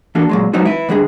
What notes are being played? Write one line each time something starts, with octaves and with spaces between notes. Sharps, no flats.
E3 A#3 D4 F#4 A4
A#2 F#3 G#3
F#3 G#3 B3 C4 D#4 F#4
E4 B4
D3 G3 D4 G#4